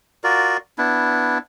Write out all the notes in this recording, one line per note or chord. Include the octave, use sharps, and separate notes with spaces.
F4 F#4 A#4 D5
B3 D4 E4